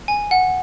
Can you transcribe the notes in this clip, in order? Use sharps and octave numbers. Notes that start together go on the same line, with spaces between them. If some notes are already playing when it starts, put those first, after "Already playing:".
G#5
F#5